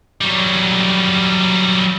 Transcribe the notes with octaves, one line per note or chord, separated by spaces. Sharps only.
F#3 G3